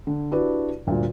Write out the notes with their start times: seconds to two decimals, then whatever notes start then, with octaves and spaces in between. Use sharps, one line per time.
0.07 D3
0.31 D4 E4 F#4 G4 B4 D5
0.87 D2 G2 A#2 D3